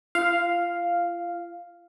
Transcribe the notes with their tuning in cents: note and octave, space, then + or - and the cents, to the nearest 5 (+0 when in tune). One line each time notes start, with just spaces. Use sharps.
F4 -35 F5 +0